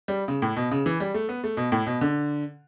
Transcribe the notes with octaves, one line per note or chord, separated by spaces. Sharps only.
G3
C#3
A2
B2
C#3
E3
G3
A3
B3
A3
B2
A2
B2
D3